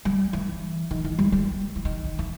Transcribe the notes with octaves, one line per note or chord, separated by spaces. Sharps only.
G3
E3
D#3
E3
G3
G3
E3
D#3
D#3
E3